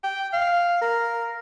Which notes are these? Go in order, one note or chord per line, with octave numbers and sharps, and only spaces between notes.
G5
F5
A#4